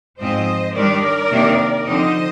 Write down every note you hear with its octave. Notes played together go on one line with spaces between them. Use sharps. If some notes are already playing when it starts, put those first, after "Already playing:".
G#2 F3 C4 C5 D#5
D#3 G3 D4 A#4 D5
C3 D#3 A#3 D4
D3 F3 C4 D#4 C5 D#5